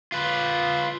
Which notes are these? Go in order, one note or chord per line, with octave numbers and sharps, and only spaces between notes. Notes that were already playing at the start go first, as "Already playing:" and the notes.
F4 B4